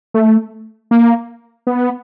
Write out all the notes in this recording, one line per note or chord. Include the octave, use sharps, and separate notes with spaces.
A3
A#3
B3